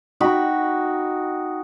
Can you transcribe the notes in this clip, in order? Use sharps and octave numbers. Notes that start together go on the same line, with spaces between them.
D#4 F#4 G5 B5